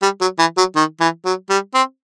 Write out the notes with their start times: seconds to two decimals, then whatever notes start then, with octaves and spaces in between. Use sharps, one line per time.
0.02 G3
0.21 F#3
0.39 E3
0.57 F#3
0.76 D#3
1.00 E3
1.25 F#3
1.50 G3
1.74 C4